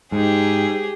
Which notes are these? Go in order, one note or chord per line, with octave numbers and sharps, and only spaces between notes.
G#2 G4 G#4